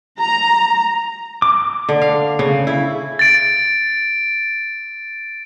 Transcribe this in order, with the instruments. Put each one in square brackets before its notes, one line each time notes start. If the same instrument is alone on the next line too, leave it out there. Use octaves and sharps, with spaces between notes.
[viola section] A#5
[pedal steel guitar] D6
[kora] D3
F5
C#3
E4
[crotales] A6 D7